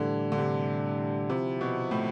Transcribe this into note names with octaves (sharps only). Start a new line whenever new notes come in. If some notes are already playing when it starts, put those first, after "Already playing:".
Already playing: A2 D3 E3 G3 D4
D3
C3
C3 F3 C4 E4
B2
A2